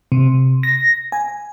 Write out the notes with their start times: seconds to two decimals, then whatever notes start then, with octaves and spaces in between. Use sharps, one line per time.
0.12 C3
0.63 A#6
1.12 G#5